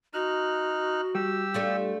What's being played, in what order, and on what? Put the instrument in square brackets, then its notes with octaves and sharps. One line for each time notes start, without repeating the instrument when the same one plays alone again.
[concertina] D#4 F6 F#6 [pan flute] F#4
[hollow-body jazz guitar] G3 [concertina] G4 E6
[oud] A3 D4 F4